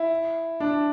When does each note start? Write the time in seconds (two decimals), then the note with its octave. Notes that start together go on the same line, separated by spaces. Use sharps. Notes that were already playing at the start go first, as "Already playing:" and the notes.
Already playing: E4
0.60 D4